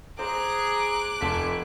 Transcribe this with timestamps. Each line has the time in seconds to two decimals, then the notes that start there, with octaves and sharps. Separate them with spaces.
0.19 G#4 C5 A#5 D6 F#6
1.21 F1 G#5 A5 C6 B6